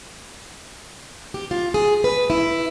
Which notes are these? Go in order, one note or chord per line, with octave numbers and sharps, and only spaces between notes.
G4
F4
G#4
B4
E4